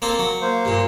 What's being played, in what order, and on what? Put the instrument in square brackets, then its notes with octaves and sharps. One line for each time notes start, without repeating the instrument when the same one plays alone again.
[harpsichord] A#3 C4 A4
F#3
[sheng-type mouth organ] A#3 C5
[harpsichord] G2 A#2